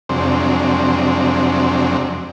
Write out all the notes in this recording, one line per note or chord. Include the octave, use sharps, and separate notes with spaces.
F2 C3 F#3 G#3 C4 D4